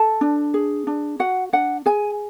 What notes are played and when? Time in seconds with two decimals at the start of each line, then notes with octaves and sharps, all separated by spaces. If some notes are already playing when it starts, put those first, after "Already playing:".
Already playing: A4 A5
0.21 D4
0.54 G#4
0.87 D4
1.19 F#4 F#5
1.53 D4 F#5
1.86 G#4 G#5